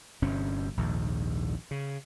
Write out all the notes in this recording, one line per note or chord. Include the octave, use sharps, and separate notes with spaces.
G1 G2 C3 C#4
A#1 D#2 G#2
C#3